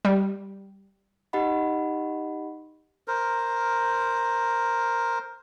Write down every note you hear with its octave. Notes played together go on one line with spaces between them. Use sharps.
G3
D#4 G4 D#5 F#5 B5
A#4 C5